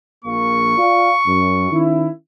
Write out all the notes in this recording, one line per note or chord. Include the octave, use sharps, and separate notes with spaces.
A#1 A#3 C#6
F4 D5 F5
F#2
D#3 C#4 E4